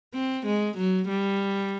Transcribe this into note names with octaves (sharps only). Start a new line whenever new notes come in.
C4
G#3
F#3
G3